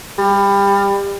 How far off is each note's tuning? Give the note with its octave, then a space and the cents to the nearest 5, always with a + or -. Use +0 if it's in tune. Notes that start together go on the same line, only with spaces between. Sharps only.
G3 +25